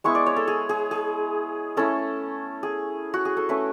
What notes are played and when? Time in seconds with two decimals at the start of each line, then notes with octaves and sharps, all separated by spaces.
0.04 G#3 B3 E4 C#6
0.15 D5
0.26 C#5
0.36 A4
0.48 G#4
0.69 G#4
0.91 G#4
1.77 A3 C#4 E4 A4
2.63 G#4
3.14 F#4
3.25 G#4
3.37 A4
3.49 A3 C#4 E4 B4